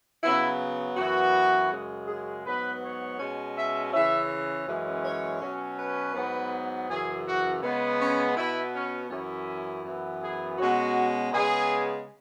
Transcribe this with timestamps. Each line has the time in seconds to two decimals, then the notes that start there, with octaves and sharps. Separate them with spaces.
0.23 C#3 F#3 B3 E4
0.97 F#2 E3 B3 F#4
1.71 F#2 C#3 G#3
2.08 G#4
2.45 G#2 F#3 B3 B4
2.83 C#5
3.19 B2 G#3 C#4
3.56 E5
3.93 C#3 E3 C#4 E5
4.67 F#2 E3 G#3 C#4
5.04 C#5
5.40 B2 F#3 C#4
5.78 B4
6.14 G#2 F#3 B3
6.88 F#2 C#3 E3 G#4
7.26 F#4
7.62 C#3 G#3 B3
8.00 C#4
8.36 B2 B3 E4
8.74 C#4
9.10 F#2 E3 C#4 E4
9.85 F#2 E3 B3
10.22 G#4
10.58 B2 G#3 C#4 F#4
11.31 C#3 G#3 B3 G#4